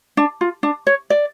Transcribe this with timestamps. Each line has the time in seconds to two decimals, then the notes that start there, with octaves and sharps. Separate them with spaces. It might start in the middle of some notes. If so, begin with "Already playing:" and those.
0.17 D4
0.41 F4
0.63 D4
0.87 C#5
1.10 D5